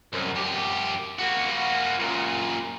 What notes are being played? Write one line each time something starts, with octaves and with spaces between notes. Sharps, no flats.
C2 F#2
F#2 G4
A#3 F#4
F#2 A#2